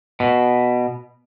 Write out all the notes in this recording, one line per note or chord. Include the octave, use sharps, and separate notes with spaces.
B2